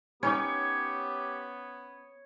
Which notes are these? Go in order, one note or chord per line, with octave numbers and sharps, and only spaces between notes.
B3 C#4 D#4 G4 C#5